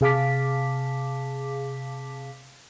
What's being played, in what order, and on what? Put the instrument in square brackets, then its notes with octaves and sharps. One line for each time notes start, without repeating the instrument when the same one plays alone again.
[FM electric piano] C3 G#4 F5 A5 D6 B6